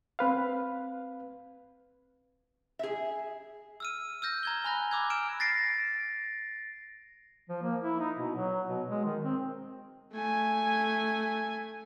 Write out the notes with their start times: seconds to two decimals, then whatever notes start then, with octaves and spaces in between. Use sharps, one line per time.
0.19 C4 B4 F5
2.79 G#4 E5
3.80 E6 F6 D#7
4.22 E6 F6 G6 A#6
4.43 A#5 G#6 G7
4.64 G#5 B5 F#6 A#6
4.91 B5 D6 E6 F#6 G#6
5.10 F6 D7 E7
5.40 A6 A#6 C7 D7
7.49 F3
7.62 A#3
7.81 E4
7.99 D#4
8.18 B2
8.35 F#3
8.67 B2
8.89 G#3
9.05 D#3
9.24 C4
10.13 A3 G#5